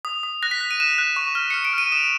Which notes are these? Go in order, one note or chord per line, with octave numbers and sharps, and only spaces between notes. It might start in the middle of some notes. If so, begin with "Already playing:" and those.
D#6
D#6
F#6 A#6
B6
F#6
D#7
F#6 E7
F#6
C#6
F6
F6 C#7
D7
F6 D#7
D#6 E7